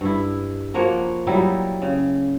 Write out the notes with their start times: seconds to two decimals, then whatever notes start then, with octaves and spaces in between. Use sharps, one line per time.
0.01 G2 E4
0.74 F3 A#3 F#4 C#5
1.27 F#3 G3 D#4 E4
1.82 C#3